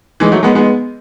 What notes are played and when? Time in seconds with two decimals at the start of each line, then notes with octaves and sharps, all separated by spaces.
0.20 E3 G#3
0.32 F#3 A3
0.43 G#3 B3
0.55 G#3 B3